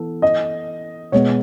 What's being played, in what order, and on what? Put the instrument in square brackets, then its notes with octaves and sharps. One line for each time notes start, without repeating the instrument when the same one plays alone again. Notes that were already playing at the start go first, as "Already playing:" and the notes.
Already playing: [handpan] E3 B3 A4
[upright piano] D#5
[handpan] B2 G#3 B3 [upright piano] C#5